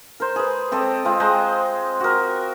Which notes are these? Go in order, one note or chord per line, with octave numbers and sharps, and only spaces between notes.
A#4 C5
G#4 B4
C4 G4 A4 D#5
G#3 C4 F4
G#3 C5 D#5 A#5
F#4 A#4